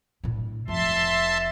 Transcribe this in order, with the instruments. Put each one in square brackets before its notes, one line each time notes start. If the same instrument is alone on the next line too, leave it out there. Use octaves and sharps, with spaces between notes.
[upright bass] A2 D4
[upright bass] F1 F3 [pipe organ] E5 A5 C6